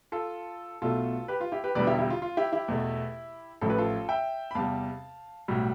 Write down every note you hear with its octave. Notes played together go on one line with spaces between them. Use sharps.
F4 A4
B1 B2 A3 F4 A4
G4 B4
F4
E4 G4
G4 B4
E1 E2 D3 G3 B4 D5
E4 G4
E4 G4
F4
F4
E4 G4
E4 G4
E2 B2 A3
A1 A2 F3 A3 A4
B4
F4 A4
E5 G5
B5
E2 C3 G3 F5 A5
B1 A2 G3